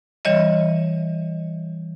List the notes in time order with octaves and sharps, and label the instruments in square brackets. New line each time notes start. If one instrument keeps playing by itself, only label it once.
[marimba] E3 G3 C#5 D#5 E5